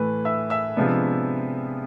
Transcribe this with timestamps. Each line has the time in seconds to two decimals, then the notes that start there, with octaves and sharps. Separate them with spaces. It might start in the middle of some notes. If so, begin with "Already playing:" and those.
Already playing: A2 E3 A3 B4
0.25 E5 E6
0.50 E5 E6
0.76 C3 F3 G#3 B3 D4